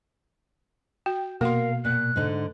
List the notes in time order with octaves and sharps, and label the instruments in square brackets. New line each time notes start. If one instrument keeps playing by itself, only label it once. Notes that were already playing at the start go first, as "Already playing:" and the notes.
[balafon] F#4 [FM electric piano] G5
[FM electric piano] B2 [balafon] A#3 F#4 C6 [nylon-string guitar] A#4 [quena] F5
[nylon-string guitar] A#2 [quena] F#6
[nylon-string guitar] G#2 D3